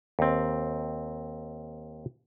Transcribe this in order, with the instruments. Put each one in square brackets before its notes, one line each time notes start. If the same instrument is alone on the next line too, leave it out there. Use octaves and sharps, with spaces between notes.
[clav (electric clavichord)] D#2 C4